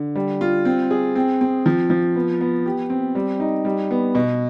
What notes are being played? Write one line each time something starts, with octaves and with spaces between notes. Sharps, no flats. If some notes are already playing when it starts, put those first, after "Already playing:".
Already playing: D3
G3
F4
C4
G#4
C4
C4
F3
F3
B3
B3
G4
C4
G3
D#4
G3
B3
B2